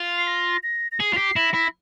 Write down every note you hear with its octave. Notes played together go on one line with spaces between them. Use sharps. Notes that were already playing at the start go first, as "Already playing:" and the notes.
Already playing: F4
C7
A#6
A#6
A#6
G#4 C7
F4
G4
E4 A#6
E4